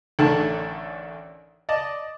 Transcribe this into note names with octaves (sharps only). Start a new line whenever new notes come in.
A1 D3 D#3 A3 D4 A5
D5 D#5 A5